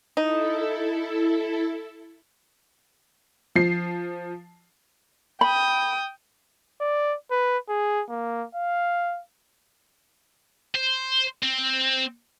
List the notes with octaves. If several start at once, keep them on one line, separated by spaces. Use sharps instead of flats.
D#4 E4 A4
F3 C7
G5 B5 D#6
D5
B4
G#4
A#3
F5
C5
C4